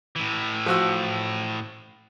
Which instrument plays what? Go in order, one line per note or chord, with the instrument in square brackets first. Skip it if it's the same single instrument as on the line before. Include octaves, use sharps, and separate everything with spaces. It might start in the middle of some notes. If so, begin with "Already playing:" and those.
[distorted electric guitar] A2 E3
[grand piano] F3 F#4 E6